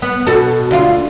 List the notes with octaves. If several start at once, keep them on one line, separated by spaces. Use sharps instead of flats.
B3
B2 F#4 A4
D2 F4